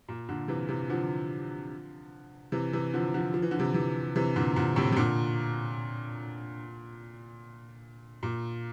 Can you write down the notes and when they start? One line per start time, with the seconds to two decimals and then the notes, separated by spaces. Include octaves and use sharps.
0.09 A#2
0.29 A#2 D3
0.48 C3 E3
0.69 C3 E3
0.90 D3 F3
2.52 C3 E3
2.73 C3 E3
2.94 D3 F3
3.14 D3 F3
3.34 F3
3.42 E3
3.51 D3
3.59 C3 E3
3.74 C3 E3
4.16 C3 E3
4.36 A#2 D3
4.56 A#2 D3
4.76 A2 C3
4.92 C3
4.97 A#2 D3
8.23 A#2